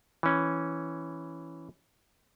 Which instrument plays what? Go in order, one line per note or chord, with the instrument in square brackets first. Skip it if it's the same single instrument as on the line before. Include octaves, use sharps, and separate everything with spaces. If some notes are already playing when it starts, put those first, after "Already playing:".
[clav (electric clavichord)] E3 C#4